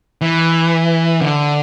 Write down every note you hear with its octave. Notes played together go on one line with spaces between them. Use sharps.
E3
D3